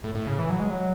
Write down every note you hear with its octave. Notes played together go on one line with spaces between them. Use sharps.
A2
A2
C#3
E3
F#3
G#3
F#3